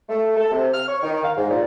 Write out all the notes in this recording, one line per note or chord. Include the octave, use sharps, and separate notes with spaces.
A3
A4
C3
F6
C#5
D#3
F5
G#2
A#2